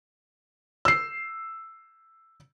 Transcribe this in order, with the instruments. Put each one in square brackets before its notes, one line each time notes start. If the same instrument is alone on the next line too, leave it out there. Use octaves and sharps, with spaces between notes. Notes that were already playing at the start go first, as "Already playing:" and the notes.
[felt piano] E6 C7